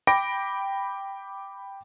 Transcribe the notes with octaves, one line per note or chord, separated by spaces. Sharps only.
G5 B5 D6 A#6 D7